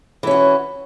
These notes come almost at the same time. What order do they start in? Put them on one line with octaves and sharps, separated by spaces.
E3 C#4 F#4